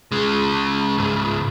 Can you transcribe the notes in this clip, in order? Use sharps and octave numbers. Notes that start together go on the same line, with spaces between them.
C#3 G#3
C#2 G#2